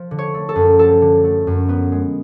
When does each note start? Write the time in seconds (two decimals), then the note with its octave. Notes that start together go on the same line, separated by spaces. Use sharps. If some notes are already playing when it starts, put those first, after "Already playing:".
Already playing: F3
0.11 D3
0.19 C#5
0.34 A3
0.49 A4
0.56 F#2
0.79 F3 A4
1.02 D3
1.24 A3
1.47 F#2
1.69 B3
1.92 G#3